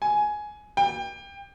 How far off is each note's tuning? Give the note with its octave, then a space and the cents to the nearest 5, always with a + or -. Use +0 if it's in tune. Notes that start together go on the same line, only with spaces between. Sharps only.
G#5 +10
G5 +20